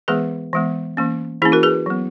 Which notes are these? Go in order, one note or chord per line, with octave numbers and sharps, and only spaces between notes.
E3 G#3 B3 G#4 B4
E3 G#3 B3
E3 A#3 C#4
E3 A#3 C#4 E4 G#4
F#4 A#4
G#4 B4
F#3 B3